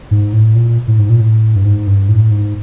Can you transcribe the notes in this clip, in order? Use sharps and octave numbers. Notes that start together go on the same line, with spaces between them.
G#2
A2
A#2
A2
G#2
A#2
A2
G2
G#2
G2
A2
G#2